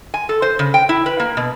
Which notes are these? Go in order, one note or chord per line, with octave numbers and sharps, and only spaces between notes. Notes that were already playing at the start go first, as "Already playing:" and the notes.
G#5
A4
C5
C#3
G5
E4
B4
A#3
B2